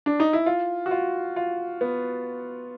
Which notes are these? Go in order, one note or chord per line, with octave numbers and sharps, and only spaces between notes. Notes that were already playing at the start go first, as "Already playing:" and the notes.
D4
D#4
E4
F4
F#4
F4
F4
B3